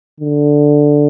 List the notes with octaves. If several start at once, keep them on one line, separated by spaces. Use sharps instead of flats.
D3